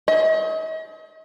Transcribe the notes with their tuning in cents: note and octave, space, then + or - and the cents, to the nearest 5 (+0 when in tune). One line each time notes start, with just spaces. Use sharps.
D#5 +40